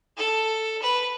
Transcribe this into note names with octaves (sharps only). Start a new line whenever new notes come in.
A4
B4